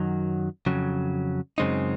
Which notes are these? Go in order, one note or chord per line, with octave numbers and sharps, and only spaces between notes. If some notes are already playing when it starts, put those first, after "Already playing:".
Already playing: F#2 D#3 F#3
F2 C#3 F#3
F#2 C#3 G#3 C4 D#4